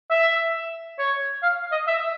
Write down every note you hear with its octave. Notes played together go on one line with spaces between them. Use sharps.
E5
C#5
F5
D#5
E5